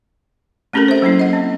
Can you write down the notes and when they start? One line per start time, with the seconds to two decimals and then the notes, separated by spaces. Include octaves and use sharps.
0.73 A3 C4 C#4 G4 A4 A#4
0.88 C5 E5
1.02 F#3 A#3 C#4 E4
1.19 D#5 F#5
1.33 C4